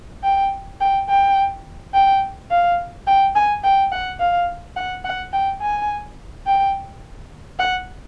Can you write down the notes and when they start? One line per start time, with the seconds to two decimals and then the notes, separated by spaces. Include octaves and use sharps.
0.23 G5
0.81 G5
1.09 G5
1.94 G5
2.50 F5
3.07 G5
3.35 G#5
3.63 G5
3.92 F#5
4.19 F5
4.77 F#5
5.05 F#5
5.33 G5
5.61 G#5
6.46 G5
7.59 F#5